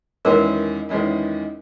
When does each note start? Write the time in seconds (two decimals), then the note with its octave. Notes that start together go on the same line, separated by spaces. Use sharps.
0.25 E2 D#3 G#3 C#4 E4 A#4
0.89 E2 D#3 G#3 C#4 E4